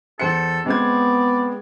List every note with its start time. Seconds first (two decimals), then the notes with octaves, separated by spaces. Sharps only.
0.20 E2 A4 C5 C#7
0.66 G#3 B3 C4 D5 G#6